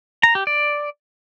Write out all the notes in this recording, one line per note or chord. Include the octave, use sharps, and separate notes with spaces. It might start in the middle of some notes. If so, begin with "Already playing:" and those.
A#5
G4
D5